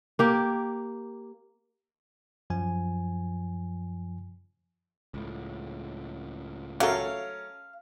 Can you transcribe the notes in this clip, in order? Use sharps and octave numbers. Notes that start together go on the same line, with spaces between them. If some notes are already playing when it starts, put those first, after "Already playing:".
A#3 G4
F#2 F3 G#5
C#2 A2
F#3 A3 C#4 A4 A#4 F5